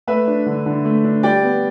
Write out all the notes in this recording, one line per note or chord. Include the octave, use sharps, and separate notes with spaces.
A3 B4 E5
D4
D3
D3
A3
D4
G3 D5 G5
B3